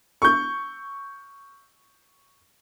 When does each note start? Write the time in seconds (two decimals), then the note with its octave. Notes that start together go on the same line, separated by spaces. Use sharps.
0.22 C#6 G6